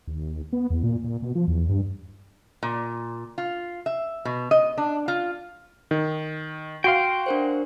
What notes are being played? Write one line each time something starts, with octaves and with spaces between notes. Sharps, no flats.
D#2
B3
E2
A#2
A#2
B2
F3
E2
G2
A#2
F4
E5
B2
D#5
D4
F4
D#3
F#4 F5 G5 C6
D4 A#4 C5